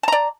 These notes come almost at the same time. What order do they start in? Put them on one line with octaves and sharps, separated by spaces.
A5 A#5 D5